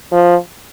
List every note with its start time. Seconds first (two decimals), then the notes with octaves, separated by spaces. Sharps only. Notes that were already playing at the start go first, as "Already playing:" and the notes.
0.12 F3